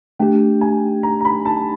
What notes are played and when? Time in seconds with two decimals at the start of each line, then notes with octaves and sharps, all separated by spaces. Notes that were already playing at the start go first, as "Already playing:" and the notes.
0.19 A3 D4 G4 G5
0.61 G#5
1.03 A#5
1.20 A#5
1.25 B5
1.45 A5